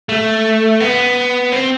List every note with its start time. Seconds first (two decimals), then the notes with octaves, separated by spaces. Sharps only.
0.09 A3
0.80 B3
1.52 C4